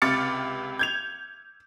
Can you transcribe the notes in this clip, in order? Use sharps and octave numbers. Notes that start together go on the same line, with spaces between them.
C#2 C3 D6 F6 A6 C#7
G6 G#6 F7